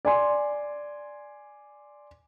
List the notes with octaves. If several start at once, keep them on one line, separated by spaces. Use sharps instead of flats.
D5 G#5 C6